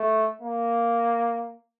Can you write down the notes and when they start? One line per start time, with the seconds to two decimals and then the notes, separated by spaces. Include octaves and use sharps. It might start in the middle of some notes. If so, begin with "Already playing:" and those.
Already playing: A3
0.42 A#3